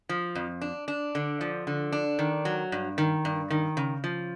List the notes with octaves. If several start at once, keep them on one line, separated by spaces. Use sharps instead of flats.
F3
F2
D4
D4
D3
F3
D3
D4
D#3
F#3
G2
D#3
G2
D#3
C#3
F3